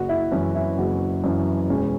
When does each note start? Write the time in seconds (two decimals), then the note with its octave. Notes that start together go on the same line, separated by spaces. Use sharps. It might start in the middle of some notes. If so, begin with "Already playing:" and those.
Already playing: F#1 F#4
0.09 E4
0.32 F#2 E3 C#4
0.55 E4
0.78 F#1 F#4
1.24 F#2 E3
1.70 E1 C#4